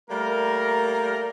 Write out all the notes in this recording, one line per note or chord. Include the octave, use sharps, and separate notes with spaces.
G3 A3 A#3 A#4